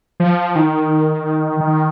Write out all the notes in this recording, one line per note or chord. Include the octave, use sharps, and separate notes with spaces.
F3
D#3
D#3